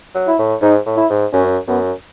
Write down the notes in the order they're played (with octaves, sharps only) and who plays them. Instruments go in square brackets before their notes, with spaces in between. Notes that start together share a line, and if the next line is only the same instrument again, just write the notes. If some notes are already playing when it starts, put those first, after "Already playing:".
[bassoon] F#3
[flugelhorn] E4
[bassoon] A2
[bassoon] G#2 [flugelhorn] D#4
[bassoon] A2
[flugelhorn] E4
[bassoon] G#2
[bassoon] F#2 [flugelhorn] C#4
[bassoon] F#2 [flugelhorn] B3